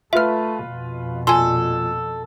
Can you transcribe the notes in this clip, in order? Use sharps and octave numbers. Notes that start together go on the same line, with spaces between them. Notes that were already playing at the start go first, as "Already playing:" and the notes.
A3 F4 B4 E5 F6
F2 B2
A#2 A4 G#5 C6